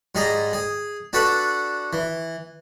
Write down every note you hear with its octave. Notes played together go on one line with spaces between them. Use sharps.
G#2 G3 G#4 A#5
G#4
D4 F#4 A4 B4 F#5
E3